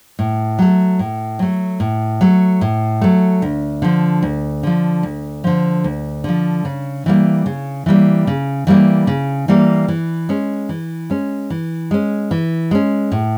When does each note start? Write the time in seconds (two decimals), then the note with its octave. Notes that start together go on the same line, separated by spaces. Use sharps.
0.19 A2
0.59 F#3 A3
0.99 A2
1.39 F#3 A3
1.80 A2
2.21 F#3 A3
2.61 A2
3.02 F#3 A3
3.42 D2
3.82 D3 F3
4.23 D2
4.63 D3 F3
5.03 D2
5.44 D3 F3
5.84 D2
6.24 D3 F3
6.65 C#3
7.06 E3 G3 A#3
7.46 C#3
7.86 E3 G3 A#3
8.27 C#3
8.67 E3 G3 A#3
9.07 C#3
9.48 E3 G3 A#3
9.88 E3
10.29 G#3 C#4
10.69 E3
11.10 G#3 C#4
11.50 E3
11.91 G#3 C#4
12.31 E3
12.71 G#3 C#4
13.12 A2